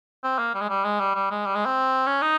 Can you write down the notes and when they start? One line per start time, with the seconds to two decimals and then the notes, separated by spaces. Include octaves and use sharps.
0.24 C4
0.39 A#3
0.54 G3
0.61 G#3
0.69 G3
0.84 G#3
1.00 G3
1.15 G3
1.31 G#3
1.46 G3
1.55 G#3
1.66 C4
2.07 C#4
2.22 D#4